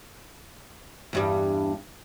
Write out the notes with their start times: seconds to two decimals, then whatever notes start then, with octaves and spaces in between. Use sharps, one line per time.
1.13 E2 G2 G3